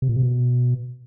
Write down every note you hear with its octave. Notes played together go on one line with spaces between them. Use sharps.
C3
A#2
C3
B2